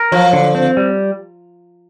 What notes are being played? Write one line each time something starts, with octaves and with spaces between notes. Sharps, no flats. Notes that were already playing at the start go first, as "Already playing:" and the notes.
Already playing: A#4
F3 F#3
D3
C4
G3